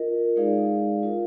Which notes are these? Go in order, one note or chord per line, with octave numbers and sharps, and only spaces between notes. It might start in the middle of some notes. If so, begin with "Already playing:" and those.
Already playing: F4 A#4 D#5
G#3 D#4 G#4 D5 F5
F4 A#4 F5